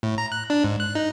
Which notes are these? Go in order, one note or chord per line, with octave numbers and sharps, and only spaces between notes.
A2
A#5
F#6
D4
G#2
F#6
D#4